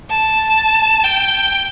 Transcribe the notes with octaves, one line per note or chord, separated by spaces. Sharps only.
A5
G5